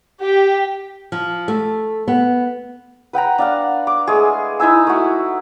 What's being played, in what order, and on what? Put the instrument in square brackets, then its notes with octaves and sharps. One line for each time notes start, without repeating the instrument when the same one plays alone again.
[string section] G4
[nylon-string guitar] F3
A3
B3
[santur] B4 F#5 G5 A#5
D4 F5 F#5
D6
G#3 A3 G#4
D#4 E4 G#5 E6
A3 F#4